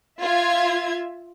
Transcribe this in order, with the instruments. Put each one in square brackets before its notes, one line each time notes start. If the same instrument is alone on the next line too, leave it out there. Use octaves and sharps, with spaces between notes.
[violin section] F4 E5 G#6